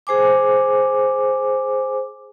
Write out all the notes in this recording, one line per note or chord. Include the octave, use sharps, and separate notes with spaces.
G#4 C5 G#5 D6